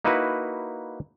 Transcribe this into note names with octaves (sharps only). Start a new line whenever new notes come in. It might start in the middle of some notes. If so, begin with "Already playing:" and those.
A#3 D#4 E4 F#4 B4